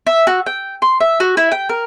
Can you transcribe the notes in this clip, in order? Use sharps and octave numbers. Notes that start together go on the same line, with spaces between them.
E5
F#4
G5
C6
E5
F#4
E4
G5
A#4